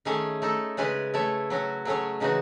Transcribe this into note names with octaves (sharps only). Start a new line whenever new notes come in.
D#3 A3 C#4 G#4 C#5
A3 D#4 A4
C#3 G#3 C#4 G#4 B4
A3 E4 A4 C#5
F#3 C#4 F#4
F#3 A3 C#4 G#4 C#5
C#3 E3 G#3 D#4 F#4